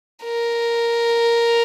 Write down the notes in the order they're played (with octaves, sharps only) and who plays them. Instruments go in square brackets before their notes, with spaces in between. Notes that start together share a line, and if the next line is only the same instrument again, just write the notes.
[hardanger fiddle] A#4